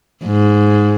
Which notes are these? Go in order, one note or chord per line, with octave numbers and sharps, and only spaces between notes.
G#2